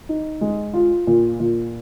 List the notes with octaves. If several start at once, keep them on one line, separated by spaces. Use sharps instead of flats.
D#4
G#3
F4
A#2
A#2